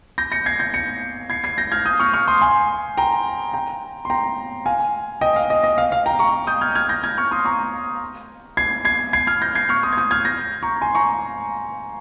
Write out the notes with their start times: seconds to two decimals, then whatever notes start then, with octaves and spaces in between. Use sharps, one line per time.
0.18 G6 A#6
0.32 A#6 C#7
0.46 G#6 C7
0.59 G6 A#6
0.74 A#6 C#7
1.30 G#6 C7
1.44 G#6 C7
1.58 G6 A#6
1.72 F6 G#6
1.86 D#6 G6
2.00 C#6 F6
2.13 C#6 F6
2.28 C6 D#6
2.42 G#5 C6
2.97 G5 A#5
3.54 G5 A#5
4.05 C6
4.10 G5 A#5
4.66 F5 G#5
5.21 D#5 G5
5.36 F5
5.50 D#5
5.64 D#5
5.78 F5
5.92 F5
6.06 G5 A#5
6.19 A#5 C#6
6.47 D#6 G6
6.61 F6 G#6
6.75 F6 G#6
6.89 G6 A#6
7.04 F6 G#6
7.18 C#6 F6
7.31 C6 D#6
7.45 A#5 C#6
8.57 G#6 C7
8.85 G#6 C7
9.13 G#6 C7
9.27 F6 G#6
9.42 G6 A#6
9.55 G#6 C7
9.69 C#6 F6
9.83 C6 D#6
9.93 G#6
9.97 D#6 G6
10.11 F6 G#6
10.25 G6 A#6
10.63 A#5 C#6
10.81 G#5 C6
10.95 A#5 C#6